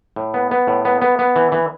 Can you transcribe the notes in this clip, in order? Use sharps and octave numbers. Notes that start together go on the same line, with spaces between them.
A2
B3
B3
A2
B3
B3
B3
E3
E3